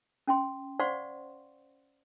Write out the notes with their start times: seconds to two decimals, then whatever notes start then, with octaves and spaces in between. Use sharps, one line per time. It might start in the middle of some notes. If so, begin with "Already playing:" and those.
0.27 C#4 G5 C6
0.80 C5 D5 F5 F#5 C6 C#6